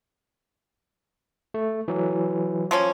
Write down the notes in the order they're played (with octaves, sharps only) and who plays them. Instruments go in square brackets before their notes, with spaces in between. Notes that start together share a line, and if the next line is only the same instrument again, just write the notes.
[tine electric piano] A3
E3 F#3
[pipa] F3 A#3 C#4